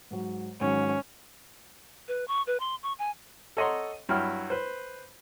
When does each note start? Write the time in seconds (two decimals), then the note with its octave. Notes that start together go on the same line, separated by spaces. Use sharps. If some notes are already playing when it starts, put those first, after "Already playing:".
0.11 G#2 F#3
0.61 G#2 D#3 F#3 C#4
2.08 B4
2.28 C#6
2.47 B4
2.60 C6
2.83 C#6
2.99 G#5
3.57 A4 C#5 D#5 F#5 A#5 C6
4.09 G2 F#3 E4 G5 B5 F6
4.50 B4 C5